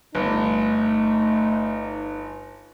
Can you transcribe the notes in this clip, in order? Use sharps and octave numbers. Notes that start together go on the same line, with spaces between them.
G1 A3 D#4